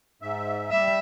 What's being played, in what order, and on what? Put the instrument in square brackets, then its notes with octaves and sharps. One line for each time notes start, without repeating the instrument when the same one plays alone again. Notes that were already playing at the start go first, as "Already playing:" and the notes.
[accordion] G#2 E5
[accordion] G3 [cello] E5